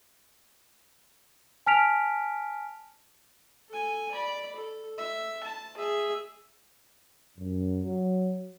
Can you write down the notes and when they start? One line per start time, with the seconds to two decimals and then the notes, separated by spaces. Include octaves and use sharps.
1.66 G#5 A5 F6 B6 D7 F7
3.69 A4 G#5
4.12 D5 B5
4.56 A4
4.98 E5
5.44 A5
5.77 G#4 E5
7.39 F#2
7.84 F#3